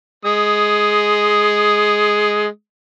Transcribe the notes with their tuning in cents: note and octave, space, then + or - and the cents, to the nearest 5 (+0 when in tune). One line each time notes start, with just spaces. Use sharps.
G#3 +10 D#6 +0